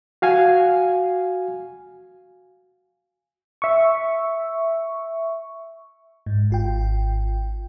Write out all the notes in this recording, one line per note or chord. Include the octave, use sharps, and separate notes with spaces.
F#4 F5 G#5
E5 C#6
G#2
G#1 F4 G5